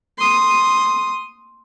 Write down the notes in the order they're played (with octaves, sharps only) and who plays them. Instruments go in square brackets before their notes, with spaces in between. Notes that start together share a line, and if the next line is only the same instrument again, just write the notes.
[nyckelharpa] C6 D#6